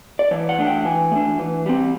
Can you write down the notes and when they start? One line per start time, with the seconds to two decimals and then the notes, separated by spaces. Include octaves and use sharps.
0.19 D5
0.31 E3 C#5
0.49 F#5
0.58 A3 D4
0.67 G5
0.85 E3 G#5
1.12 A3 D4
1.39 E3
1.66 G3 C4